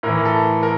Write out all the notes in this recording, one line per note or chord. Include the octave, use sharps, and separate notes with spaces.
A2 E3 A#4
A4
A#4